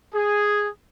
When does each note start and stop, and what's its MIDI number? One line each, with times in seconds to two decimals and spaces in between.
0.14 0.67 68